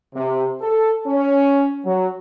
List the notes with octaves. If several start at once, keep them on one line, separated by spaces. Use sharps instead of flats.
C3
A4
C#4
F#3